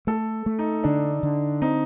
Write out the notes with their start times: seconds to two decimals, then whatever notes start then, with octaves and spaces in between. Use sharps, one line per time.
0.07 A3 A4
0.46 A3
0.59 D#4
0.84 D3 D4
1.23 D3
1.62 C4 D#4